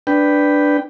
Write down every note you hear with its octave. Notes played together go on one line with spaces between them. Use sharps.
D4 B4 G5